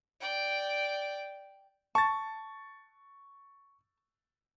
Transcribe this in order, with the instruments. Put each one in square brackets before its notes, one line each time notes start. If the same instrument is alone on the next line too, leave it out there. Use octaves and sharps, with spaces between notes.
[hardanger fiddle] D5 G5
[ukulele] A5 [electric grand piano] C#6 A6